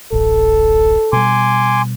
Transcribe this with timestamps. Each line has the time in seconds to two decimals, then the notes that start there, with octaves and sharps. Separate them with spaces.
0.12 D1 A1 A4
1.13 B2 G3 G#5 C6 D6